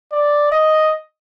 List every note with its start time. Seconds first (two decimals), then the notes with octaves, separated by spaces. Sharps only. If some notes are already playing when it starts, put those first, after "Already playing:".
0.12 D5
0.51 D#5